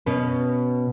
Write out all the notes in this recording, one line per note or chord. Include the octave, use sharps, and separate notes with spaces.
B2 C#4 B4